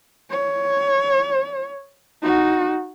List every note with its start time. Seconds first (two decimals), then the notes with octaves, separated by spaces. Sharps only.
0.31 C#5
2.22 D#4 F#4